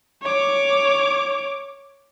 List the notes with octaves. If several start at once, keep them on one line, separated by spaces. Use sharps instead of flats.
C#5 D6